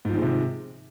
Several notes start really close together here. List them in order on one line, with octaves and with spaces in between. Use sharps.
G#2 F3 D#3 G#3 C3